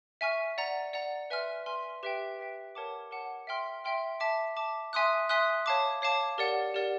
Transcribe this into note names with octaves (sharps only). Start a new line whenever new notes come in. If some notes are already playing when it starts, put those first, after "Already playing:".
E5 G#5 C#6 F6
D5 F#5 A#5
D5 F#5 A#5
B4 E5 G#5 C6 F6
B4 E5 G#5 C6 F6
G4 B4 E5 G5
G4 B4 E5 G5
A#4 C#5 F#5 A5 D6
A#4 C#5 F#5 A5 D6
E5 G5 C6 F6
E5 G5 C6 F6
E5 A5 D6
E5 A5 D6
E5 G#5 C6 D#6 F#6
E5 G#5 C6 D#6 F#6
C#5 F5 A5 D6
C#5 F5 A5 D6
G4 A#4 D5 F#5
G4 A#4 D5 F#5